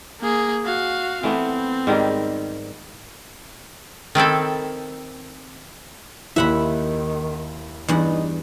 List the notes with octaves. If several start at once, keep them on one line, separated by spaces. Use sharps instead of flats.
A#3 G#4
F#4 F5
E3 A3 B3 C4
G#2 D#3 G3
D#3 C4 E4 A4
D#2 D#3 E4 E5 F#5 B5
E2 G2 D#4 F#5